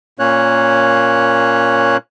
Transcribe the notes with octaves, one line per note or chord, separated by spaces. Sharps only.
A#2 A#3 C#4 C#5 F#6